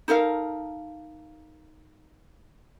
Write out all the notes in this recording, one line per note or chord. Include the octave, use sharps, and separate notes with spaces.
D#4 A4 A#4 F5